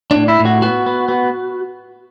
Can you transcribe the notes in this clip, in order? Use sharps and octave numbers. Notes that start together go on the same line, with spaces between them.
A2 D4
E4
A2
F#4
B3 F#4
B3
B3